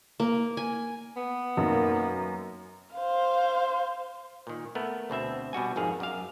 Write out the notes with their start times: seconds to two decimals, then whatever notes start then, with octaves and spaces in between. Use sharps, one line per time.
0.20 A#3
0.57 G#5
1.17 B3
1.57 F#2 B2 A#3 D#4
2.96 C5 F5
4.47 A#2 D#3
4.75 A3 B3 A#4
5.10 D2 B2 C4 E5
5.53 B2 G3 F#4 G#5
5.76 G#1 F2 G#2 D#3 G#4 F5
6.00 F#2 D5 F5